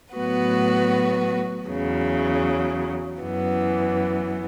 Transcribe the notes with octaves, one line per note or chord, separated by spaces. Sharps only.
A2 F#3 B3 F#4 B4
E2 C#3 F#3
F#2 E3 B3